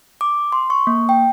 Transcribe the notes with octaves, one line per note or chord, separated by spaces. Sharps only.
D6
C6
C#6
A#3
G5